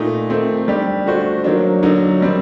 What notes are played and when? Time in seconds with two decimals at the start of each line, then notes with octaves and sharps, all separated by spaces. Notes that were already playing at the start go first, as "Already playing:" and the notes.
Already playing: A#2 A3 D#4
0.30 D#3 A3 C4
0.68 G3 D4 G4
1.06 D3 A3 D4 F#4 C5
1.44 D#3 F#3 A#3 D4
1.83 D3 F#3 A#3 D#4
2.21 D#3 G3 C4